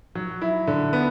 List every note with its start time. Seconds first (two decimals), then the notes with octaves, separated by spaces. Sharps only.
0.15 F#3
0.42 E4
0.67 D3
0.93 B3